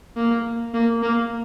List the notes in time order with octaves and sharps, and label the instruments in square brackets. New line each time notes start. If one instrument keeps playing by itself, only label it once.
[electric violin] A#3
A#3
A#3